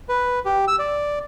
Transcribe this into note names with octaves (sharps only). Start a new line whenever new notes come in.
B4
G4
E6
D5